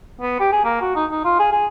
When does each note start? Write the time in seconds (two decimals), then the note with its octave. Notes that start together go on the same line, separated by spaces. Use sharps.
0.21 B3
0.40 G4
0.52 G#4
0.64 A#3
0.81 F#4
0.96 D#4
1.11 D#4
1.24 F4
1.39 G#4
1.52 G#4